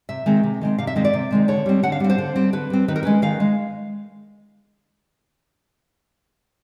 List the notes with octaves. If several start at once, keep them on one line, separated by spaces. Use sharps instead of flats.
C3 E5
D#3 G#3 C4
C3
D#3 G#3 C4
C3 F5
E5
D#3 G#3 C4 D#5
D5
C3
D#3 G#3 C4
D3 C#5
G3 C4
D3 F#5
F5
G3 C4
C5
D3
G3 C4
D3 B4
G3 C4
D#3 B4
A#4
G#3 C#4 B4
D#3 F5
G#3